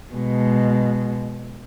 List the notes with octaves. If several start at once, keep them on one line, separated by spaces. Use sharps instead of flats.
B2 G#3